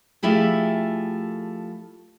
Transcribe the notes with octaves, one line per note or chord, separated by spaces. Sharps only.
F3 A3 E4 G4 G#4